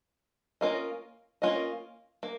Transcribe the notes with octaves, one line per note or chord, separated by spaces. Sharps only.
A#3 C#4 F4 A#4 D#5
A#3 C#4 F4 A#4 D#5
A#3